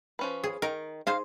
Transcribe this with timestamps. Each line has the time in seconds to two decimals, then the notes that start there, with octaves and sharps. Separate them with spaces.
0.19 F3 C#4 B4
0.44 G#4
0.62 D#3 A#4
1.07 D#4 G#4 C5 F5